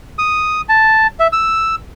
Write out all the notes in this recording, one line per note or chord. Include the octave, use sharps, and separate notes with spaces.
D#6
A5
E5
E6